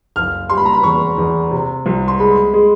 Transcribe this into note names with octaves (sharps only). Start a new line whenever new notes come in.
F#1 F6
G3 C6
B5
A#5
B5
E2 C#6
E2
C3
C2
C6
G#3 B5
G#3